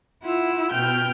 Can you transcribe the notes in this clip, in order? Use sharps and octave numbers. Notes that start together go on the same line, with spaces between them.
E4 F4 F#5 E6
B2 G5 F6 G6